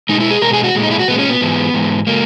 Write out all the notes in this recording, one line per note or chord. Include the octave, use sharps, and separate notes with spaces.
B2 G#3 D#4
E4
G#4
B2 G#3 A#4
G#4
F#4
A#2 G#3
D#4
E4
F#4
A#2 G#3 B3
C#4
B3
G#2 E3 G#3
G#2 E3 G#3
C#3 G#3 A#3